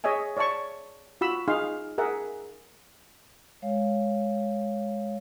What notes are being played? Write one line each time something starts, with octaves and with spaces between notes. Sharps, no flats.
G#4 C#5 D#5 E5 G#5
C#5 D5 E5 A5 C#6
F4 F#4 B5 E6
D#4 G#4 F5 C6
G#4 A#4 E5 F#5
G#3 C#5 F5